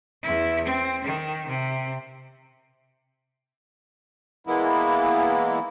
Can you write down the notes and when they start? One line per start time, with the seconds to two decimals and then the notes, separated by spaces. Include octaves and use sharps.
0.22 E2 E4
0.64 C4
1.04 D#3
1.47 C3
4.47 E3 G#3 A#3 B3 E4